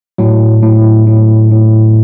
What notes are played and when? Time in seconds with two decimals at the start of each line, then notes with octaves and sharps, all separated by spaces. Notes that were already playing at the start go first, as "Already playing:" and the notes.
0.18 A2 F#3
0.63 A2
1.07 A2
1.51 A2